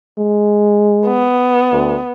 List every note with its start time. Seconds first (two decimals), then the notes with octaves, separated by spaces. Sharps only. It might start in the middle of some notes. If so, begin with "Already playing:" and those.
0.18 G#3
1.06 B3
1.72 D2